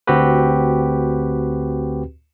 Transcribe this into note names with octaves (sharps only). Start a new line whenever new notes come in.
D2 C4 F#4 G4 B4